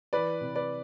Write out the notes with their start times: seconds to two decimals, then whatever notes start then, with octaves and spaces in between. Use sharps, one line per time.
0.13 E3 B4 D5
0.41 C3
0.56 B4 D5